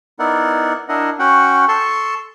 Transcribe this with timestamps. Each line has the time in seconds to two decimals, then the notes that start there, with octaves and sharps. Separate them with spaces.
0.19 B3 D#4 E4 A#4 D5 F#5
0.89 D4 E4 A#4 D#5 F#5
1.19 C#4 F#4 F#5 G5
1.68 A4 A5 C6 C#6